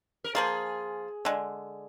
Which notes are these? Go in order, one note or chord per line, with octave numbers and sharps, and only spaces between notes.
A#4
F3 A#3 F4 G#4
D3 G#3 D4